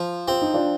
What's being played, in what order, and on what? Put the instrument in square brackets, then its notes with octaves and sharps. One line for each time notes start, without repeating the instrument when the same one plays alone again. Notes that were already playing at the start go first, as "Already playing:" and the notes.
Already playing: [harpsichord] F3
[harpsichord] C4 [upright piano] F4
[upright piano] D#4
D4 F4